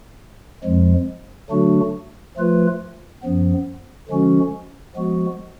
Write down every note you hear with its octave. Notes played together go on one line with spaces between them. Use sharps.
F2 F3 G#3
D3 F#3 A3 D4 F#4
F3 A3 F4 B4
F#2 F3 B3
D3 F3 G#3 C#4 F#4
F3 G#3 B3 F#4